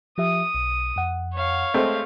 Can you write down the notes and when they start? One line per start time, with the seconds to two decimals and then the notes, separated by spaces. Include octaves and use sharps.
0.18 F3 G4 E5 D#6
0.54 B1
0.96 F2 F#5
1.34 C#5 F5
1.74 G#3 A3 C4